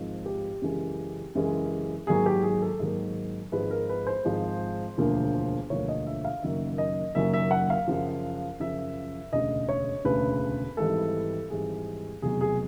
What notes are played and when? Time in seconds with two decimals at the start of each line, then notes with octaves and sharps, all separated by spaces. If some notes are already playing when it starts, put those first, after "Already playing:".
Already playing: G#1 G#2 F3
0.26 G4
0.62 F#2 C#3 E3 G#3 C#4
1.35 F#2 C#3 E3 G#3 C#4
2.07 G#2 D#3 F#3 A#3 G#4
2.26 G4
2.43 G#4
2.62 A4
2.80 G#2 D#3 F#3 A#3
3.52 G#1 G#2 F3 G#3 B4
3.71 A#4
3.89 B4
4.07 C5
4.25 G#1 G#2 F3 G#3
4.98 E1 D2 D3 F3 A#3
5.70 E1 D2 D3 F3 A#3 C#5
5.88 D#5
6.07 E5
6.25 F5
6.42 F#1 F#2 D#3 F#3 A#3 E5
6.78 D#5
7.15 F#1 F#2 D#3 F#3 A#3 E5
7.34 E5
7.51 F#5
7.70 F5
7.88 F#2 C#3 F3
8.60 F#2 C#3 F3 E5
9.33 E1 D2 C#3 D#5
9.69 C#5
10.05 E1 D2 C#3 B4
10.77 G#1 G#2 E3 G3 A4
11.50 G#1 G#2 E3 G3 G#4
12.22 F1 E2 B2 F#3 G#4
12.41 G#4